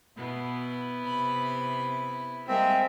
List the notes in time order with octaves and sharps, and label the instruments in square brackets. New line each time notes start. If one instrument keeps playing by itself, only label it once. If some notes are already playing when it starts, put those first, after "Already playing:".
[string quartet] B2 [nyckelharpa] B3 E4
[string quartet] C3 B5
[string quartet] G3 G#3 A#3 [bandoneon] C4 [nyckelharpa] E5